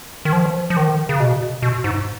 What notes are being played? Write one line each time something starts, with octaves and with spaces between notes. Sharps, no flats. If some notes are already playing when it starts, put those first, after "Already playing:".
D#3
F3
F3
D#3
C#3
B2
B2
G#2